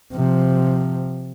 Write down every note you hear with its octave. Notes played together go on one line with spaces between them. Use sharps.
C3 F3